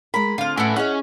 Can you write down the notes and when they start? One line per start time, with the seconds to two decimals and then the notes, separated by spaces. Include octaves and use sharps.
0.14 G#3 A#4 B5
0.38 D3 C4 F4 F5
0.58 A2 C#4 E4 F#4 A4 B4
0.76 C#4 E4 G#4 D#5 F#5